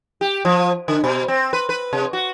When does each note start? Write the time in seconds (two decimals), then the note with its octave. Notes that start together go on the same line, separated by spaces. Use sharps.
0.21 G4
0.45 F3
0.88 D3
1.04 B2
1.28 C4
1.53 B4
1.69 B4
1.93 C3
2.13 F#4